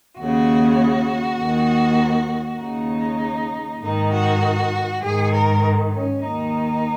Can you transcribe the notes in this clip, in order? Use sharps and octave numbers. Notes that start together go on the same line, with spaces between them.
D#2 C#3 F#4
D#2 D#3
D#2 C#3 D#4
G#2 D#3 D#4
F#4
G#2 D#3 G#4
A#4
C#4
D#2 D#3 D#4